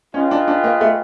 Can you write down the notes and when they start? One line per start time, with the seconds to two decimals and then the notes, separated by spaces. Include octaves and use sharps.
0.14 C#4 F4 G#4 B4 D#5 G5
0.31 D4
0.48 D4
0.64 A#3
0.81 A3